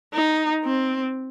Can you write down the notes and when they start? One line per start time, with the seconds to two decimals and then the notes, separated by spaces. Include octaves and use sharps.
0.14 D#4
0.65 C4